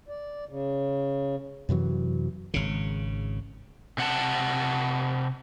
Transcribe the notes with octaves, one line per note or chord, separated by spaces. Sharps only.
D5
C#3
F#2 C3 E3 F#3
G#1 C#3
C3 F#5 A5